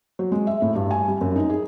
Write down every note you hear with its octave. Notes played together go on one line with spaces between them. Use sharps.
F#3
G#3
E5
A2
G2
G#5
G3
F#2
D#4
G#4